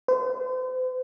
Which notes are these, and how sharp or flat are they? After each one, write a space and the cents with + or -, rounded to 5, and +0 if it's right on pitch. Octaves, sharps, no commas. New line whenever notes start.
C5 -40